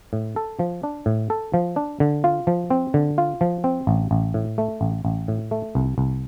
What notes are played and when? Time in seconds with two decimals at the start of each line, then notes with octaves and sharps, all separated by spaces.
0.13 A2
0.36 A4
0.59 F3
0.83 D4
1.06 A2
1.30 A4
1.54 F3
1.76 D4
2.00 D3
2.24 F4
2.47 F3
2.70 C4
2.94 D3
3.18 F4
3.41 F3
3.64 C4
3.87 A1
4.11 A1
4.34 A2
4.58 A3
4.81 A1
5.05 A1
5.28 A2
5.51 A3
5.75 C2
5.98 C2